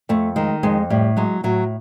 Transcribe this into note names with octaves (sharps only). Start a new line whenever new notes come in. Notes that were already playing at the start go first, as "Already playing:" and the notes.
F2 A3
D#3 G#3
F2 G#3
A2 G3
F#3 G#3
A2 F#3